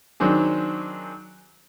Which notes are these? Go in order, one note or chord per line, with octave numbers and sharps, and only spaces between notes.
D#3 F#3 C4 D4 G#4